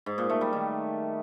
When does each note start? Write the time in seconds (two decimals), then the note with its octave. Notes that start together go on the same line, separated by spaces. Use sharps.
0.06 G#2
0.18 A#2
0.30 A3
0.41 G3
0.53 D#3